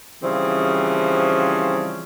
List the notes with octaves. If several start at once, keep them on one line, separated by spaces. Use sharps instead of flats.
C#3 E3 F3 G3 C4